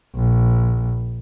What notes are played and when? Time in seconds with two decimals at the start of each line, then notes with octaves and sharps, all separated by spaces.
0.15 A#1